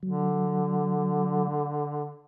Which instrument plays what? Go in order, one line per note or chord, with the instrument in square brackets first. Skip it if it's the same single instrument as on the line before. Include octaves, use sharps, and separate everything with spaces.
[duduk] D3 [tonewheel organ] F#3